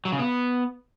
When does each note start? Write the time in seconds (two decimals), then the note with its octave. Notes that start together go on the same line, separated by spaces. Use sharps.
0.05 F#3
0.12 C#3
0.19 B3